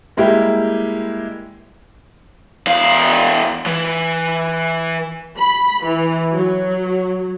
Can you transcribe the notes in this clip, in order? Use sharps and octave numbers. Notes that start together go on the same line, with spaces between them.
G3 G#3 A#3 E4 G4
E2 F5
E3
B5
E3
F#3